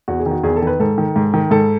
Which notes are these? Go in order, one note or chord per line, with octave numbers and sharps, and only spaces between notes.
E2 F#4
G#4
D#3
F#4
E2 G#4
A4
D#3 B4
G#2 A4
D#3
G#2
D#3
G#2 A4